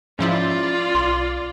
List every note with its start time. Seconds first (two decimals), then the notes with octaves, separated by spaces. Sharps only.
0.19 G#2 F3 C#4 E4 F4 D5
0.95 B1 C6